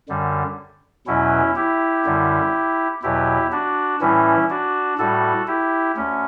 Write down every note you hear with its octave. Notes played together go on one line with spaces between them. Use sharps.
F#2 D3 G3
E2 B2 F#3 C#4 E4
E4 G4
F#2 D3 G3
E2 B2 F#3 E4 G4
D4 F#4
A2 E3 G3 C#4 E4
D4 F#4
A2 G3 F#4 A4
E4 G4
D2 C#4